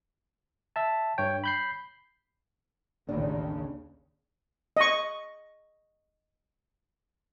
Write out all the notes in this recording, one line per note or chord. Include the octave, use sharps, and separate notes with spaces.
E5 A5
G2 C#5 G5
B5 G6 C7
A1 D#2 C#3 D4
D#5 C#6